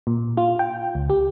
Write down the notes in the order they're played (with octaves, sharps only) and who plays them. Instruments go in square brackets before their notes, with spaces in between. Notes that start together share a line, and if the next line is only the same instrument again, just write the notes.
[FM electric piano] A#2
F4
G5
C#2
G4